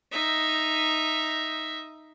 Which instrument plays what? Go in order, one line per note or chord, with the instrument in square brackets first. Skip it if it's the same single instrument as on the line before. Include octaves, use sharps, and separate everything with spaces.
[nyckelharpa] D#4 E5